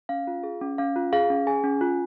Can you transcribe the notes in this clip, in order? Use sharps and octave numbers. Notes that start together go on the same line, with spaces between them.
C#4 F5
F4
G#4
C#4
C#4 F5
F4
G#4 F5
C#4
G#4 G#5
C#4
F4